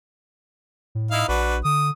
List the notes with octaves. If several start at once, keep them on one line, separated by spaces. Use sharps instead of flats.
A2
D#4 E4 F5
A#1 D4 F#4 B4
D3 D#6